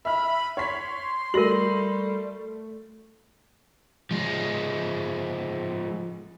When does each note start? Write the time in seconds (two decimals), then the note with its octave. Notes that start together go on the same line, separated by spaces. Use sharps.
0.05 E5 B5 F6
0.57 C#5 C6 B6
1.34 G3 A3 F#4 A#4 A#6 F#7
4.11 F3 G#3